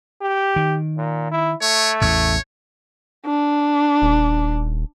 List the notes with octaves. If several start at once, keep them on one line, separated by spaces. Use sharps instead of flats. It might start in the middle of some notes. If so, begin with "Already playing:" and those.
G4
D#3
A#2
E4
A3 C#5
A1 E2 C#5
D4
D#1